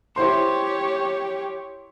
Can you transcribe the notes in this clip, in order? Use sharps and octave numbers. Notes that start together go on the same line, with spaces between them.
E4 G4 C5 C#5 C6